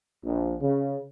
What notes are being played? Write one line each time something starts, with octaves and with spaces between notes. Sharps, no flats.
A#1
C#3